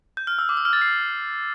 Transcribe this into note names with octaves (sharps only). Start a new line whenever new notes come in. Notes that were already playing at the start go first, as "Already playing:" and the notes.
G6
F6
E6
D6
E6
F6
A6
C7